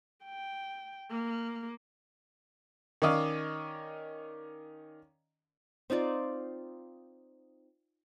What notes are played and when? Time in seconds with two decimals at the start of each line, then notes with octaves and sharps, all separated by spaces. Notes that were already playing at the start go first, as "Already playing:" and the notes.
0.25 G5
1.11 A#3
3.02 D#3 C#4 D5 D#5 F5
5.90 C4 D#4 F4 D5